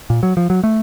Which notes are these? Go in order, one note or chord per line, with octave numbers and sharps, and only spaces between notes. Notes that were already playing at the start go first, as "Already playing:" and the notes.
A#2
F#3
F3
F#3
A3